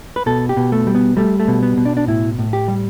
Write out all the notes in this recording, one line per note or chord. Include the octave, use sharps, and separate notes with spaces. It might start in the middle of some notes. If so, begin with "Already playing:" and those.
B4
B2 A4
G4
B2
A3
G3
B3
G3 A3
A3
B2
B3
B2
D4
D4
A2 E4
A2
G4
G3